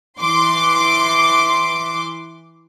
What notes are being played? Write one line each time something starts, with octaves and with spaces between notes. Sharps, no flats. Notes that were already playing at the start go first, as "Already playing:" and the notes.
E3 C6 D6